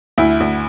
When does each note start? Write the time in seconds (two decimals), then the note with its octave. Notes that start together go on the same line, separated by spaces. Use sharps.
0.18 D2 E4
0.40 D2